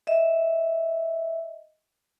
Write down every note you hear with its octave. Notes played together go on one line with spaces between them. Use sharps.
D#5 E5